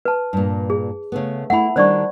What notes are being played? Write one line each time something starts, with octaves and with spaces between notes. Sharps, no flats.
B4 A5
G2 A#2
G#4
C#3 A3 B3
A3 E4 F#5 B5
D#3 G3 D4 C5 D5 C#6